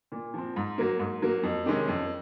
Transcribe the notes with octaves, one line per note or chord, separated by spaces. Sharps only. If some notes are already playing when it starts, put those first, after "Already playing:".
A#2
F3 C4
G#2
F#3 A#3
G#2
F#3 A#3
F2
C3 D#3 G#3 C#4
F2